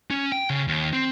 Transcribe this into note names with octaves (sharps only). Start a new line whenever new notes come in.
C#4
G5
C#3
D#2
C4